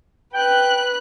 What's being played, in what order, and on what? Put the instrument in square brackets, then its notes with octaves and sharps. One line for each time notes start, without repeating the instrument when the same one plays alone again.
[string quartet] B4 F#6 [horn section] G5